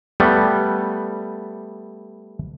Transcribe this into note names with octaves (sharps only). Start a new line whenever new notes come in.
G3 A3 B3